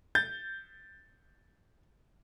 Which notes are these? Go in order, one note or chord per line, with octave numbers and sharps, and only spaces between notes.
G6 A6